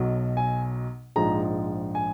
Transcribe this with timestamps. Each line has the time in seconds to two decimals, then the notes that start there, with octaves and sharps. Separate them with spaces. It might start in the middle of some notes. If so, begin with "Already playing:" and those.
Already playing: B1 B2 F#3
0.37 G#5
1.16 A#1 G#2 F3 G#3 A#5
1.95 G#5